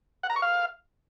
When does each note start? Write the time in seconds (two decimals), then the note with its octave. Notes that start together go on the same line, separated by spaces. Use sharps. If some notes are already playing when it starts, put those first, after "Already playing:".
0.23 F#5
0.30 A#5
0.36 C#6
0.42 F5